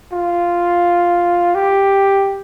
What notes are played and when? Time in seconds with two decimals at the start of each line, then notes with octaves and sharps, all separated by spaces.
0.13 F4
1.55 G4